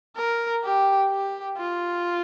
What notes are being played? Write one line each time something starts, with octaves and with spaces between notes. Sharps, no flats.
A#4
G4
G4
F4